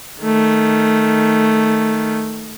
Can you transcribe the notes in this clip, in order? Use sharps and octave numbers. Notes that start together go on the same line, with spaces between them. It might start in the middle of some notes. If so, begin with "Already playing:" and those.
D#3 A3